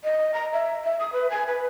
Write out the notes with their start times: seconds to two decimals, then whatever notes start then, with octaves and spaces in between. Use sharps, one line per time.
0.04 D#5
0.34 A#5
0.53 E5
0.84 E5
0.99 D#6
1.12 B4
1.30 G#5
1.47 B4